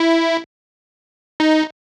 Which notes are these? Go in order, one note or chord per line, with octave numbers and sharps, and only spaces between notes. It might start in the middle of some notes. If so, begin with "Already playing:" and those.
Already playing: E4
D#4